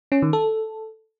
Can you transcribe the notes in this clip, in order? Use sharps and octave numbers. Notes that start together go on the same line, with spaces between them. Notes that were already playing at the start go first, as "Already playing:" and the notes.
C#4
D#3
A4